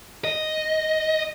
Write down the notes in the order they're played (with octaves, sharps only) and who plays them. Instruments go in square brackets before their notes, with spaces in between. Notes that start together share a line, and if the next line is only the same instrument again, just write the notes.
[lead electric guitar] D#5